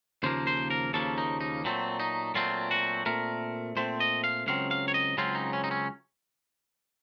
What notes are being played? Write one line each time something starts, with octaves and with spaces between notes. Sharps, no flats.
D#2 C#3 F3 A#3 C5
C5
A#4
D#2 C#3 F3 A#3 A4
D#4
D#4
A#2 F#3 A3 C4
D#4
A#2 F#3 A3 C4 F4
F#4
A#2 A3 C4 A#4
A#2 A3 C4 C5
D#5
F5
C#2 C#3 F#3 C4 F5
F5
C#5
D#5
C#2 C#3 F#3 C4 F4
D#4
C#4
D#4
C#4